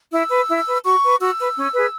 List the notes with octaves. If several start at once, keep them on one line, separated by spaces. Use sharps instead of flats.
E4 E6
B4
E4
B4
F#4 C#6
B4
F#4 E6
B4
C#4
G#4 B4